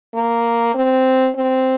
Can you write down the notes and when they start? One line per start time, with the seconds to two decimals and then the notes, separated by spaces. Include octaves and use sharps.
0.14 A#3
0.74 C4
1.36 C4